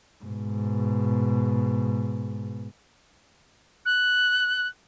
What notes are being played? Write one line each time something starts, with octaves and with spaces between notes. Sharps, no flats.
G#2 B2
F#6